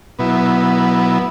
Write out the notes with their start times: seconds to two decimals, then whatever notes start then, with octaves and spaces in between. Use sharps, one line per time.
0.19 B2 F#3 B3 E4